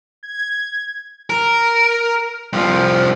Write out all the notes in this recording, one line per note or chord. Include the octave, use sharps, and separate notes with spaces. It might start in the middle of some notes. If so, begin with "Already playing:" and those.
G#6
A#4
C2 F3